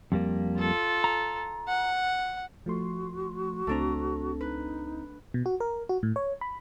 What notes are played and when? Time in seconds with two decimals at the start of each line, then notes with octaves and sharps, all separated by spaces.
0.12 F2 G3 A#3
0.58 F4 A4
1.04 A#5
1.68 F#5
2.66 F3 A3 F#4 C6
3.67 C#2 A3 C4 D4 A#5
4.41 D#4 B4
5.34 B2
5.46 F#4
5.60 A#4
5.89 F#4
6.03 A2
6.16 C#5
6.41 B5